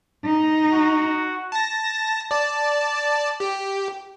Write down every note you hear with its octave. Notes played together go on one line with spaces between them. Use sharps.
D#4
F#4
A5 A#6
D5 A5
G4